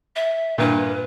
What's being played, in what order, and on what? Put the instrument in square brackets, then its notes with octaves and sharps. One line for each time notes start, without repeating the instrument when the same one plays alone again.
[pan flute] E5
[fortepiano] G2 A#2 [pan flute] B4